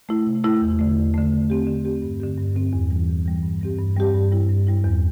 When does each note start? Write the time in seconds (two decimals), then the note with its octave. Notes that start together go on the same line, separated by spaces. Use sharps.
0.09 A3 E4
0.27 C3
0.44 A3 E4
0.61 E2
0.79 D3 A3
0.97 E2
1.14 D3 A3
1.32 D3
1.50 C4 G4
1.67 D3
1.85 C4 G4
2.02 G2
2.20 D3 C4 G4
2.38 G2
2.55 D3 C4 G4
2.73 E2
2.90 E3 G3
3.08 E2
3.26 E3 G3
3.43 G2
3.61 G3 C4 G4
3.78 G2
3.96 G3 C4 G4
4.14 G2
4.32 G3 E4
4.49 G2
4.67 G3 E4
4.84 E2